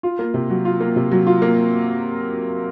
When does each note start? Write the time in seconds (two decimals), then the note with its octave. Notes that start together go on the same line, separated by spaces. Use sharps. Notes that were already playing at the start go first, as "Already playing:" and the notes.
0.03 F4
0.19 A#3
0.34 C3
0.50 F#3
0.65 F4
0.80 A#3
0.96 C3
1.11 F#3
1.27 F4
1.42 A#3